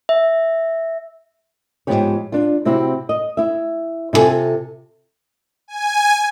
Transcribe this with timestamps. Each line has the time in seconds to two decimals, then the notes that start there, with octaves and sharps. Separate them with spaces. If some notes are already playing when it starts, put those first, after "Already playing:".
0.09 E5
1.87 G#2 E3 F3 B3 G4 C#5
2.32 D4 F4
2.65 C3 C4 E4 F#4 G4
3.09 D#5
3.37 E4 E5
4.13 C3 E4 F4 A4 G#5
5.68 G#5